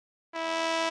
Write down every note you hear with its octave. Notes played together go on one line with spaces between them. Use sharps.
E4